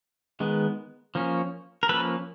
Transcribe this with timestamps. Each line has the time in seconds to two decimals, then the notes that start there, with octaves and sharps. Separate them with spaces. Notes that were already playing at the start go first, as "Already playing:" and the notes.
0.40 D#3 G#3 B3
1.15 F3 A#3 C#4
1.83 A#4
1.89 F3 A#3 C#4 A4 B4